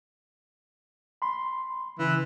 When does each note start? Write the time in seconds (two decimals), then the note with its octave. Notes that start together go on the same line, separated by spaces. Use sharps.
1.22 B5 C6
1.99 C#3 E3